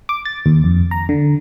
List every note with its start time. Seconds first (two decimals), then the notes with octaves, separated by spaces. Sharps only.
0.09 D6
0.25 A6
0.46 D#2
0.64 F2
0.91 A#5
1.09 D3